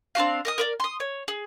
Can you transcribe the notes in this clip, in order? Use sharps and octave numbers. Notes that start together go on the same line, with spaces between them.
C4 D4 F#4 F5
A#4 D#5 D#6
A#4 B4 D5
C6 D#6
C#5
G#4